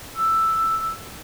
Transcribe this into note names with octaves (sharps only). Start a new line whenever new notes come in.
E6